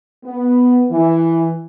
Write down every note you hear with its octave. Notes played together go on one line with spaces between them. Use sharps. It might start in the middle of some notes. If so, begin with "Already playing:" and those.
B3
E3